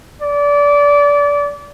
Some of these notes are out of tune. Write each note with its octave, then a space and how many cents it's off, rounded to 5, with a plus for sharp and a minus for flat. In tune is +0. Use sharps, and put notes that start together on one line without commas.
D5 -25